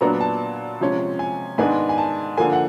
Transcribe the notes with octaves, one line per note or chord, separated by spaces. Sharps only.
A#2 F#3 B3 D4 A#5
A5
C3 F3 G#3 C#4
G#5
G#2 D#3 G#3 B3 D4 G#5
G#5
A5
D3 F3 A#3 G#5
F#5